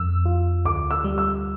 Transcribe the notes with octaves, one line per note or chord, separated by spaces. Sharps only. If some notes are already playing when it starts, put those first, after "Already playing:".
Already playing: F2 E6
F4
D2 D6
E6
G3
E6